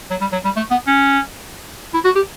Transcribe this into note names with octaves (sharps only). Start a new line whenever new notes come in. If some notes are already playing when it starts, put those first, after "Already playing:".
F#3
G3
F#3
G3
A3
B3
C#4
E4
F#4
G4